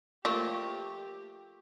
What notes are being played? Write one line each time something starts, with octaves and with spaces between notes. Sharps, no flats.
F3 A3 A#3 G4 A#4 C#6